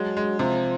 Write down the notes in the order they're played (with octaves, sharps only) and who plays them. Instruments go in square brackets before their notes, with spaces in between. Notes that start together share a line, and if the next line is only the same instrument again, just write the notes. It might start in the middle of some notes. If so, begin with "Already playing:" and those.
Already playing: [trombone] F#3 [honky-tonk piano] G#3
[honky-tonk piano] G#3
[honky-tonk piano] C3 [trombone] F3